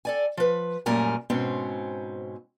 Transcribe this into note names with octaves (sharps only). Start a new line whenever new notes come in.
A4 D5 G#5
F3 B4
F#2 A#2 G3 A3 A#4 G#5
G#2 B2 C4 C#4